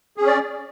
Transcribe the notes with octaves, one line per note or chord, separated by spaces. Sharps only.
C#4 G#4 D5